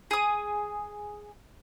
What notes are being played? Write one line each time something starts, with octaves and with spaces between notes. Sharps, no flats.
G#4 D#6